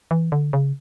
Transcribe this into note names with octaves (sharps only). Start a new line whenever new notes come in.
E3
D3
C#3